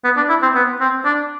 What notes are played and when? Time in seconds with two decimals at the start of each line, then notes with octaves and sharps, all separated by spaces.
0.04 B3
0.17 D4
0.29 E4
0.42 C4
0.55 B3
0.80 C4
1.05 D4